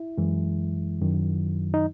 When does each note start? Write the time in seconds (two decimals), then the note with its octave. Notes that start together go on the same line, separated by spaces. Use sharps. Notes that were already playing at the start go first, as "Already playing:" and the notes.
Already playing: E4
0.18 F#2 E3 G#3
1.01 F#2 D#3 F#3
1.74 D#4